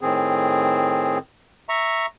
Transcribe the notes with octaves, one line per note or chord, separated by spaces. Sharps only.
A2 D#3 C4 G#4
E5 A#5 C#6